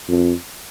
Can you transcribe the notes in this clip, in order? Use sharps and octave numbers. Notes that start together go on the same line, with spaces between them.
F2